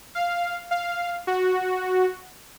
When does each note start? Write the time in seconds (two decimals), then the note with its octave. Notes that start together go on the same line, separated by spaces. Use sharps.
0.15 F5
0.71 F5
1.27 F#4